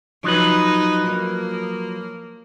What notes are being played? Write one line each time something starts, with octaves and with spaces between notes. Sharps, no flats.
F3 F#3 D#4 B4
A#3